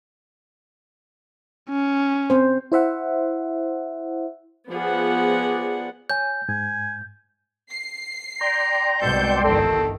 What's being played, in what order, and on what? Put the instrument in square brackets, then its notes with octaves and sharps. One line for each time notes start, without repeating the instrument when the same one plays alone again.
[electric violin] C#4
[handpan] C4 C5
[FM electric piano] E4 C5 E5 F#5
[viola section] F3 B3 G#4 D5 F#5
[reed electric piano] C#5 G#5 [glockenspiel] G6
[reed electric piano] G#2 [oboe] G#5
[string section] C7
[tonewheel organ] D5 G5 C6 [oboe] A#5
[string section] C2 G#2 G6 [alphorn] B2 [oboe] A4
[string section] G1 E2 D#3 [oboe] C4 [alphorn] A4